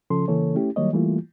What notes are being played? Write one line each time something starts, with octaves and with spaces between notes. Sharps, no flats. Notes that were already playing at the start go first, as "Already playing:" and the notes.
C#3 F3 C#4 A4 C6
C#3 E3 A#3 A4 C#5
A3 C#4 E4 G4
D#3 F#3 G3 A#3 C#5 D#5
E3 G3 A3 A#3 E4 F4